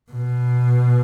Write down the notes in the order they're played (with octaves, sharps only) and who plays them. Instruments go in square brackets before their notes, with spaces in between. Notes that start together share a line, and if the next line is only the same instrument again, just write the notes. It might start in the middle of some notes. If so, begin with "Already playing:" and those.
[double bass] B2